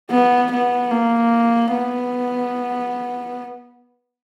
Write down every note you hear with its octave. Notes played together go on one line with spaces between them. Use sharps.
B3
B3
A#3
B3